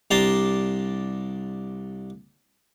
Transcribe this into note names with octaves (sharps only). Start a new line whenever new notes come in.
C2 D4 G4 A5 A#5 C6